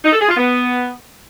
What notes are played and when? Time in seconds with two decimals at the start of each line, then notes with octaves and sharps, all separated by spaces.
0.05 D#4
0.13 A4
0.21 G#4
0.29 F4
0.37 B3